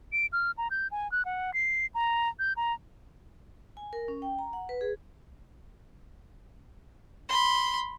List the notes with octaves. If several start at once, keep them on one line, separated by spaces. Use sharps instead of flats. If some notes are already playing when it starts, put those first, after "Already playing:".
D7
F6
A#5
G6
G#5
F#6
F#5
C7
A#5
G6
A#5
G#5
A#4
C#4
G5
A#5
F#5
B4
G#4
B5 C6